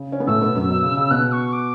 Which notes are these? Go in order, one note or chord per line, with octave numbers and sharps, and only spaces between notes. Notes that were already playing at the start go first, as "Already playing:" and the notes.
Already playing: C#3
C#4
B3
A2 A3 E6
B2 B3
F#2 F#3
B2
C#3
C#3
B2 F#6
C#6
D6